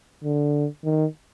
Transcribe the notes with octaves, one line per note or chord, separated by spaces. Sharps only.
D3
D#3